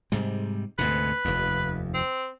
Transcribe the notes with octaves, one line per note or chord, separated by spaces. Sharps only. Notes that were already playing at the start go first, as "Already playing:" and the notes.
G#2 C3 G3
D2 G#2 C3 B4
F1 D#2
C4